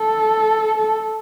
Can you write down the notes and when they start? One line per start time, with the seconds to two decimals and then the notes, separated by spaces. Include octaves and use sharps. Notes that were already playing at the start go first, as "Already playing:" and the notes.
Already playing: A4
0.77 A4